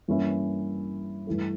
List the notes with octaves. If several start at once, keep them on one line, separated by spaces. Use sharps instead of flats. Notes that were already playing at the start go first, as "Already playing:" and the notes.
G2 E3 A#3 C#4 E4
G2 E3 A3